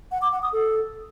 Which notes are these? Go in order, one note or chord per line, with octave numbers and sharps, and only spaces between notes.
F#5
D6
F#5
D#6
A4